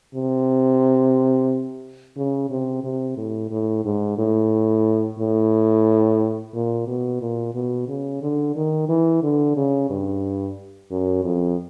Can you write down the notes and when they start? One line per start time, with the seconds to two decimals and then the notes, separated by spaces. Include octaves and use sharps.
0.15 C3
2.17 C#3
2.50 C3
2.84 C3
3.17 A2
3.51 A2
3.85 G#2
4.18 A2
5.19 A2
6.54 A#2
6.87 B2
7.21 A#2
7.55 B2
7.88 C#3
8.22 D3
8.55 D#3
8.89 E3
9.23 D3
9.56 C#3
9.90 G2
10.91 F#2
11.24 F2